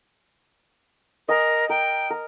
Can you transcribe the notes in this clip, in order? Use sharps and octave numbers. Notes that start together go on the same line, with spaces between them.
A#4 D#5 G#5
A#4 G5
A#4